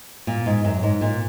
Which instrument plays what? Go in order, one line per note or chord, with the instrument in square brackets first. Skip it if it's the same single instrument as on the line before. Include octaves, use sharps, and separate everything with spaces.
[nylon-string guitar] A#2
G#2
F#2
G#2
A#2